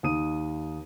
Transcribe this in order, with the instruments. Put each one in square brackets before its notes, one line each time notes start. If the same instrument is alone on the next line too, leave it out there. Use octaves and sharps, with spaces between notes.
[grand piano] D#2 D#6 D#7